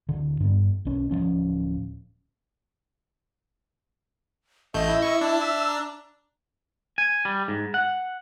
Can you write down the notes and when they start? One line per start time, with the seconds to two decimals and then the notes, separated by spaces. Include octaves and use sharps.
0.09 D1 D3
0.40 G2 B3
0.85 B1 C#4
1.11 D1 D#2 F3 C#4
4.74 A1 A3 D#5 G6
4.88 E4
5.02 C#6
5.21 D4 A5
5.41 E5 E6
5.67 A#5
6.98 G#5
7.25 G3
7.48 G#2
7.74 F#5